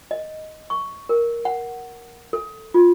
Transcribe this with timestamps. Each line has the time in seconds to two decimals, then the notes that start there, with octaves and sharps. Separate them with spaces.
0.11 D#5
0.70 C#6
1.09 A#4
1.45 F#5
2.33 A4
2.74 F4